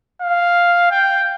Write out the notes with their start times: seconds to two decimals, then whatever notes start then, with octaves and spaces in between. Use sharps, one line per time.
0.22 F5
0.91 G5